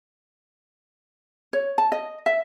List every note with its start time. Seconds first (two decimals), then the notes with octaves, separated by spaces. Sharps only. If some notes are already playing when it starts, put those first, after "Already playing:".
1.53 C#5
1.78 A5
1.92 D#5
2.26 E5